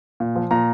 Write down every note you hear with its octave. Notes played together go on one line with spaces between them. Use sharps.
A#2
F3
A#2 A#5